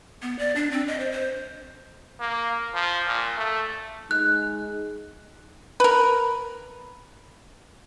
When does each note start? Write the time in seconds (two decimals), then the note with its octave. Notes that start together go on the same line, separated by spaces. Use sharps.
0.22 B3
0.39 D5
0.56 D4
0.71 C4
0.88 D#5
1.00 C5
1.12 C5
2.20 A#3
2.74 F3
3.07 A#2
3.37 A3
4.11 G#3 D#4 F#6
5.80 A#4 B4